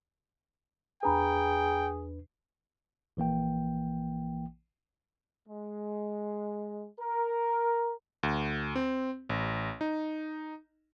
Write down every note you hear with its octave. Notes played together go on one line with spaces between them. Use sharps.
E2 D4 G#4 B4 G5 G#5 A#5 B5
A#1 E3 A#3 G5
G#3
A#4
D2
C4
A1
D#4